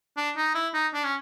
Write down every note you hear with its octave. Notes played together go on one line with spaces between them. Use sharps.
D4
D#4
E4
D#4
D4
C#4